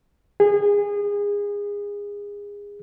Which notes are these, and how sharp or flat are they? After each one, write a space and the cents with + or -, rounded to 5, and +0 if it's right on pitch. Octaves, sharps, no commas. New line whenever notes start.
G#4 -25